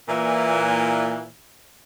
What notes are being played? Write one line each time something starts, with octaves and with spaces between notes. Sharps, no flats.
A#2 E3